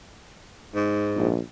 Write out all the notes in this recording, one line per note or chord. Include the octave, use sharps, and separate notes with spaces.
G#2
A#1